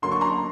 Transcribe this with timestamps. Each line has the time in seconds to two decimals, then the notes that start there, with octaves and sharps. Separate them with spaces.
0.02 D3 F#3 A#3 C6
0.12 C#6
0.21 A#5 C6